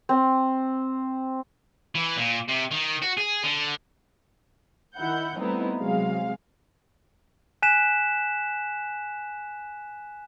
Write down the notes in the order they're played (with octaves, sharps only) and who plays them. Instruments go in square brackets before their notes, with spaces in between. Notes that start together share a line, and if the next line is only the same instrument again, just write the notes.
[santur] C4
[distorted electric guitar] E3
A#2
C3
D#3
F#4
G#4
D3
[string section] D#3 E4 F#5 G6
G3 A3 B3 C4 D#4 E4
C3 F#3 G#3 F5
[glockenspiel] G#5 F#6 B6 E7